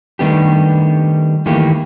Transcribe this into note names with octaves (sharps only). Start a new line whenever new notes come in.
D#3 G3 A3 B3 D4 G4
D#3 E3 A3 A#3 G4